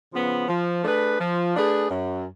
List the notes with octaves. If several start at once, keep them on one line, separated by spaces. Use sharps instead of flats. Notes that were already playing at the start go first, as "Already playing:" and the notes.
C#3 F3 B3
F3
A3 D4 G#4 B4
F3
A3 D4 G#4 B4
F#2